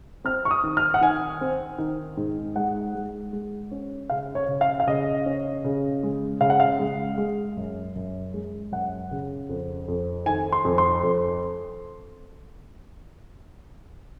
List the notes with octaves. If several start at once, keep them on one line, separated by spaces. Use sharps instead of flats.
C4 F6
C#6
D#6
D#3
F6
F#5
D#3 G#5
C4
D#3
G#2
G#3 F#5
G#3
G#3
C#4
C#3 F5
C#5
C#3
F5
F5
C#3 D#5
C#4
C#3
G#3
C#3 F5
F#5
F5
G#3
G#3
F#2
F#2
G#3
F#2 F#5
C#3
F2
F2
D#3 G#5
C6
F2
C6
F2